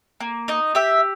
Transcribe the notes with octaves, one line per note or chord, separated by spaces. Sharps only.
A#3
D#4 D#5
G4 E5